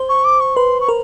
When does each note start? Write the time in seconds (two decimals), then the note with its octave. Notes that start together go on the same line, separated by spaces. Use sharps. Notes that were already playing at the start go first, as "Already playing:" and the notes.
Already playing: C5
0.09 C#6
0.24 D6
0.40 C#6
0.56 B4 C6
0.81 C#6
0.89 A#4